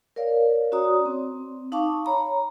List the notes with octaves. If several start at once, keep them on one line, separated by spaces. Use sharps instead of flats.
A#4 C#5 D5 F5
C#4 F#4 C#5 D5 A#5 D#6
C4
D#4 F5 A5 C#6 D6
C#5 A#5 B5